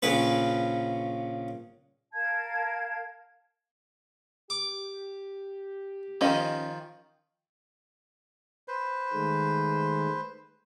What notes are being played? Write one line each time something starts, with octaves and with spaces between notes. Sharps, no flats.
A#1 C#3 C#4 B4
A#4 F5 A5 G#6
G4 D6
D#3 F3 C#4 D#5
B4 C5
D#3 G#3 A3